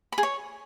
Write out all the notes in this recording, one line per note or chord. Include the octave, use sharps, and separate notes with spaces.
B5
G#4
C#5